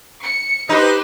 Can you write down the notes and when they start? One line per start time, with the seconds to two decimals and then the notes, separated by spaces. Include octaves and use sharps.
0.22 C#7
0.69 D#4 G4 B4 C5